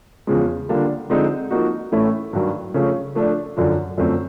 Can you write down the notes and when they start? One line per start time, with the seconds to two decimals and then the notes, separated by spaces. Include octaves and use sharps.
0.27 E2 C#3 F3 G#3
0.69 D3 G3 A#3 D4 F4
1.10 D3 F3 G#3 C4 D#4
1.51 F3 A#3 D#4 F#4
1.92 A2 E3 A3 C#4 E4
2.33 G2 D#3 F#3
2.74 C#3 F3 A3 C#4
3.15 F3 A3 D4
3.57 F#2 D3 F3
3.98 F#2 D3 F3 A3 C4